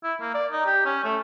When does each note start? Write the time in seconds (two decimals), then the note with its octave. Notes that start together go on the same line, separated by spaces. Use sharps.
0.04 E4
0.21 A#3
0.34 D5
0.51 D#4
0.66 G4
0.85 C#4
1.04 A3